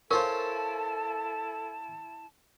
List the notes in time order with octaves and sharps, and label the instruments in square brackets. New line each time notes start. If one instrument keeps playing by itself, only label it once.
[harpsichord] C#4 F4 C5 [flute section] E4 A5 [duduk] A4 [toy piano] A#4 C#6